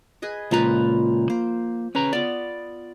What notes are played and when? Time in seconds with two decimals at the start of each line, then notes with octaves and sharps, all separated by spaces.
0.22 G#4 B4 D#5
0.51 C#2 A#2 F3 F4 B4 A#5
1.30 A#3 C5
1.95 C#3 C#4 B4 A#5
2.13 B3 F4 D5